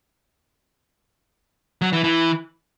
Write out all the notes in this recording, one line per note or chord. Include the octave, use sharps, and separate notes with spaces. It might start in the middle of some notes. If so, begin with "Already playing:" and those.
F#3
E3
E3